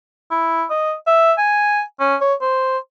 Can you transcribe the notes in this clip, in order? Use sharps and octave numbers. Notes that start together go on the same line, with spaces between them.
E4
D#5
E5
G#5
C#4
C#5
C5